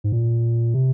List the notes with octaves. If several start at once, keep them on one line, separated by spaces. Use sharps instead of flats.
G#2
A#2
C3